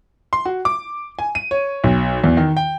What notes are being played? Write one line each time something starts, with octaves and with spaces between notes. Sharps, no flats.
C6
F#4
D6
G#5
D#7
C#5
B1
E2
D#3
G5